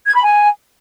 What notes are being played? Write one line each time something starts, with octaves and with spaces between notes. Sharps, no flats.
G#6
B5
G#5